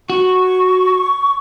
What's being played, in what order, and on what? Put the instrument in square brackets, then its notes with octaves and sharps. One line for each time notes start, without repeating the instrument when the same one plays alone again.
[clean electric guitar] F#4 [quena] C#6